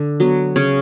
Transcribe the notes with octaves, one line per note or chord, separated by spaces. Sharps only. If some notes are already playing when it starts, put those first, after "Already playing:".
Already playing: D3
F#3 B3
C#3 C#5